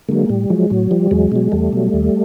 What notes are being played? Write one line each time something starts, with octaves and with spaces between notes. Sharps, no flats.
D3 F#3 G#3 A#3
A2 G3
F3 F#3 G#3
A2 F#3
F3 G3
E2 F#3 G#3
B2 F#3
E2 G3 A3
B2 F#3
D#2